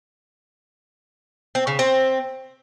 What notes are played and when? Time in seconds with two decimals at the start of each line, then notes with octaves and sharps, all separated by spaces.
1.55 C4
1.67 C#3
1.79 C4